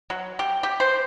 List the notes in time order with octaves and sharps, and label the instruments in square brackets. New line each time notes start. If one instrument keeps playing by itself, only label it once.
[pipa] F#3
G4
G4
C5